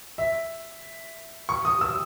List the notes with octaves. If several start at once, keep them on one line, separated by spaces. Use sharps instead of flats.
E5
C#6
D#6
E6